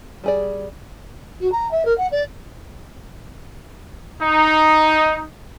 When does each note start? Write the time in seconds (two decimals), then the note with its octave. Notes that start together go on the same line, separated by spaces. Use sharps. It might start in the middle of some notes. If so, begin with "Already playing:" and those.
0.24 G3 G#4 D5
1.40 F#4
1.52 A#5
1.71 E5
1.85 A#4
1.98 F#5
2.11 D5
4.21 D#4